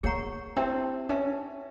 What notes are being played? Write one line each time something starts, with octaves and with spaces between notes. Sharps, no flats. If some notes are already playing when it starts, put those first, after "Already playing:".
A#3 G#4 C#5 F#5 A#5 C#6
C4 E4 G4 B4 E5 A5
C#4 B4 E5 A5